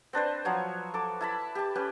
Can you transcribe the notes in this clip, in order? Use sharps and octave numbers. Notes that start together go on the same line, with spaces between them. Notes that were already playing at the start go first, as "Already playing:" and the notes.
C4 D4 B4 C5
F3 F#3 C#5
A4 D6
E4 A5 B5
G4 A5
C#4 G4 B4